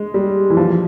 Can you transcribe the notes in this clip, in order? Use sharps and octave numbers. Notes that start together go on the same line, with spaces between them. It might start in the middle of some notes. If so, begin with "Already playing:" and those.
Already playing: G#3
G3
E3
F3